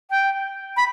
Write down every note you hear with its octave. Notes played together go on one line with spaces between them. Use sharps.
G5
B5